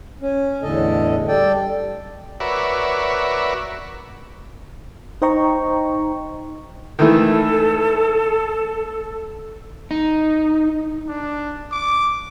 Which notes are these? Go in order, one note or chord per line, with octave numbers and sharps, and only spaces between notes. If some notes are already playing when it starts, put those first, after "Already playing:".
C#4
E2 A2 D3 A4 D#5
G3 A4 D5 G5
F#4 A#4 B4 C#5 D5 E5
D#4 C5 D#5 G5 A#5 C#6
D#3 E3 A3 A4
D#4
D4
D6